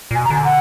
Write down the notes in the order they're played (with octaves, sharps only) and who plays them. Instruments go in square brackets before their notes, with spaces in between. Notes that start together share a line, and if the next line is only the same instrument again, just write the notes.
[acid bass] A#2
[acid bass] B2 [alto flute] G#5
[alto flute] A#5
[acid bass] D3 [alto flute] G#5
[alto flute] F#5